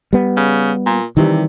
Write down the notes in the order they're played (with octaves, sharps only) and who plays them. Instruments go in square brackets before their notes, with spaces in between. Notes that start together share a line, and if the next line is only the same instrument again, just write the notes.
[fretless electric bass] G3 B3
[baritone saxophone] C#3
A#2
[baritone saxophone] C3 [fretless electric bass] D#3 E3 G3